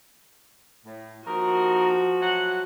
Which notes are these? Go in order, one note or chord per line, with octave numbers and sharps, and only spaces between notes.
A2
D#2 F3 D#4 F#4 A#4
F#3 A3 F#5